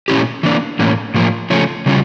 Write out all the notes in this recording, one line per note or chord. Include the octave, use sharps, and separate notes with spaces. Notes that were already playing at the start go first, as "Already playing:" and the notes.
A#2 F3 C#4 E4 G4
E3 A#3 D4
A2 E3 A#3 C#4
A2 F3 A#3
C#3 F3 A3 C#4
C#3 G3 C#4 F4